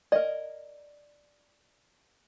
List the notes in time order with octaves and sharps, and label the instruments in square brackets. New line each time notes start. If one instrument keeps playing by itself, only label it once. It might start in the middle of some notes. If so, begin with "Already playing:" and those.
[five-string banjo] A#4 D#5 [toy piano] D5